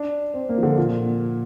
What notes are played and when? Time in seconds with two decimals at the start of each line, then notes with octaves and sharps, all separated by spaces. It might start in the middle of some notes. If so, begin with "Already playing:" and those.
Already playing: D4
0.34 C4
0.49 A#3
0.58 F3
0.63 D3
0.78 A#2